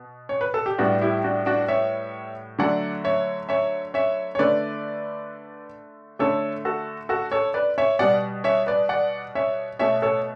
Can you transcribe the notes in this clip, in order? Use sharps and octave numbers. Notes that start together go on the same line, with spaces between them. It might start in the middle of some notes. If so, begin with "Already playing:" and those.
Already playing: B2
C#5
B4
A4
G4
A2 G3 B3 D4 F#4
E4 G4
D4 F#4
D4 F#4
C#5 E5
D3 F#3 A3 D5 F#5
C#5 E5
C#5 E5
C#5 E5
C#5
D3 A3 B4 D5
D3 A3 A4 C#5
F#4 A4
F#4 A4
A4 C#5
B4 D5
C#5 E5
B2 G3 B3 D5 F#5
C#5 E5
B4 D5
D5 F#5
C#5 E5
B2 A3 C#5 E5
A4 C#5